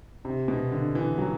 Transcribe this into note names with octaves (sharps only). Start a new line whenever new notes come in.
C3
B2
D3
E3
F#3